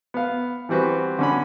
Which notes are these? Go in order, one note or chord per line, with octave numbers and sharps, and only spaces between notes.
B3 F5
E3 G3 C4 F#4 B4
D3 C#4 B5